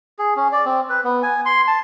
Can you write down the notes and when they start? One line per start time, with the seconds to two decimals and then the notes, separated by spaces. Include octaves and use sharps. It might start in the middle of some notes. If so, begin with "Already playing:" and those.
0.19 G#4
0.36 C#4
0.52 D5
0.65 C4
0.89 B4
1.04 B3
1.23 G#5
1.46 C6
1.68 A5